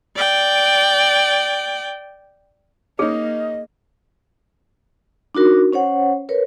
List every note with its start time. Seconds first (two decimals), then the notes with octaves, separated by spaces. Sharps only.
0.16 D5 G5
2.99 A#3 C#4 D#4 G#4 D#5
5.35 D4 D#4 F#4 A#4
5.73 C#4 C5 C#5 F#5
6.29 A#4 B4 C#5